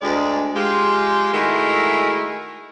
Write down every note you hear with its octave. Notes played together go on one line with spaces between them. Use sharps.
D2 G#3 D5
G#3 F4 G4
D#3 G#3 A3 E4 F#4 A#4